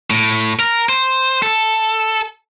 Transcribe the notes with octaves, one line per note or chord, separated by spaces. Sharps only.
A2
A#4
C5
A4